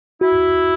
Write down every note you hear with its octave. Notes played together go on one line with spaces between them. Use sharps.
E4 F#4